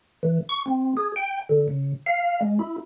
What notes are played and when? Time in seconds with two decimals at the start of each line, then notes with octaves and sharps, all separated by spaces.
0.23 E3
0.49 C#6
0.66 C4
0.97 G#4
1.16 G5
1.49 D3
1.68 C#3
2.06 F5
2.41 G#3
2.59 E4